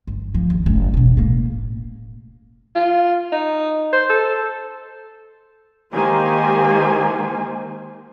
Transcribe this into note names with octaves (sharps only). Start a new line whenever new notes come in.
G1
F3
G#1 D#2
F#1 A2
E1 B2
A2 A#3
F4
D#4
C5
A4
D#3 G#3 A#3 G4 C5 G#5